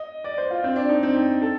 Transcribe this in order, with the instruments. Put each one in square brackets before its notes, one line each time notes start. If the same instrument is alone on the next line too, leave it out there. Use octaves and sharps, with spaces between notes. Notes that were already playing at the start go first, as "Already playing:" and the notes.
Already playing: [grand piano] D#5
D5
C5
F4
C4
D4
D#4
C4
D#4
A4